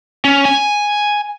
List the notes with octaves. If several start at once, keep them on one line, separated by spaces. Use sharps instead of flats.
C#4
G#5